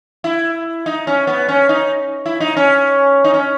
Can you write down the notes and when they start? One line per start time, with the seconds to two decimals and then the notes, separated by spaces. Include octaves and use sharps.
0.24 E4
0.86 D#4
1.07 C#4
1.27 B3
1.48 C#4
1.69 D#4
2.26 E4
2.40 D#4
2.57 C#4
3.24 D#4
3.34 C#4